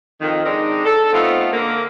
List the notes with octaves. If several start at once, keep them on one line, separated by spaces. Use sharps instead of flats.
F2 D#3
G#3 C4 D4 D#4
A4
A3 B3 C4 D#4 F4
D3 A#3